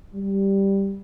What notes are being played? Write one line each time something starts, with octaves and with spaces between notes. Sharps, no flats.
G3